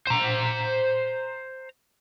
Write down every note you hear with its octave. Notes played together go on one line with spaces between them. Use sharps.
C5 A#5